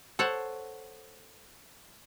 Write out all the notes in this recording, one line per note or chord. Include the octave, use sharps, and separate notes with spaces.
A4 C5 C#5 F#5